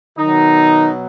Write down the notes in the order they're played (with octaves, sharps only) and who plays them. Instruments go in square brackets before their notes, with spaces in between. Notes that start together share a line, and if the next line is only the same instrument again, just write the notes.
[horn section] B2 D#3 F#3 D#4